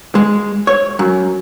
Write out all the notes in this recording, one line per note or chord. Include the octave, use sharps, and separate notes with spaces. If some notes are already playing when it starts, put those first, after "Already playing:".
G#3
C#5
F#2